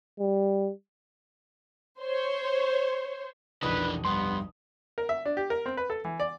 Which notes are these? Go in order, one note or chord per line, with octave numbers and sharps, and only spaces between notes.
G3
C5 C#5
F1 B1 E3 D4 B4 D#6
G2 B3 C6
A#4
E5
D4
G4
A#4
C4
B4
A4
E3
D5